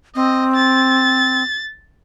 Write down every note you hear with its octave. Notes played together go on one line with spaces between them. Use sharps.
C4 D#5
A6